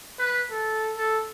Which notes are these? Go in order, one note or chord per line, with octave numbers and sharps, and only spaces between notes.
B4
A4
A4